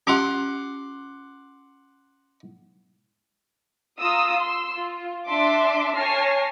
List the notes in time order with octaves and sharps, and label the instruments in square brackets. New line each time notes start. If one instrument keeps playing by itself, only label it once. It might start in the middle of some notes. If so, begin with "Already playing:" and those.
[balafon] C#4 F4 G4 [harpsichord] F#5 C6 D6
[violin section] F4 A#5 D#6 E6
C6 E6
F4
D4 E5 C6 D6
C#5 G#5 A5 F6 A#6 C7